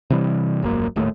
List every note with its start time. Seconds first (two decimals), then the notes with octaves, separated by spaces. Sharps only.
0.10 C3 E3 G3
0.62 D#1 G#1 F#2 A#3
0.96 D#1 D#2 A2 A3